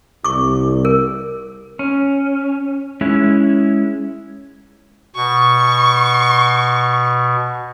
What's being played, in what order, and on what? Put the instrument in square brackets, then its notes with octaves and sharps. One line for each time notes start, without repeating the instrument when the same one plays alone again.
[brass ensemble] C2 [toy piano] C#6 D6
[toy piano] A#4
[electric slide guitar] C#4
G#3 C#4 E4
[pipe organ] B2 [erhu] C#6